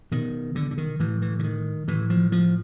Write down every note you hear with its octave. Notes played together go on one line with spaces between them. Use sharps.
B2 D#3
D3
D3
D#3
A2 E3
E3
D3
D#3
A2 E3
F3
F3